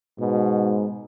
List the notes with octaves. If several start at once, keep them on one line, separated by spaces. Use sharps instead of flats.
G#2 B2